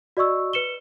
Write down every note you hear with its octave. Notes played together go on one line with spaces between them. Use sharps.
F#4 D5 D#5 C#6 E6
B4 C#7 E7 G7